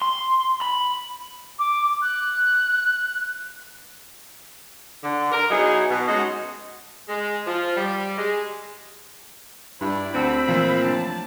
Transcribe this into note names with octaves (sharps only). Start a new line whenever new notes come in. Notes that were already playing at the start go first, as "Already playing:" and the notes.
C6
B5
D6
F#6
D3
A#4
F#3 B3 D#4 E4 G#4 D#5
B2
G#3 C#4 D#4 F#4 G#4 D#5
G#3
F3
G3
G#3
G2 E4 D5 B5
D2 C4 B5 E6 C#7 D7
A#2 E3 F3 A3
F#3 D4 A5